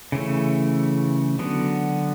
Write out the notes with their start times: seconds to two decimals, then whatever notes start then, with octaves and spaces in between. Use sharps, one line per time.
0.12 C#3 E3 A3
1.39 D3 F#3 B3